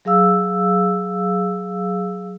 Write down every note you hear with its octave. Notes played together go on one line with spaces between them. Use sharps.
F#3 G#4 F5 E6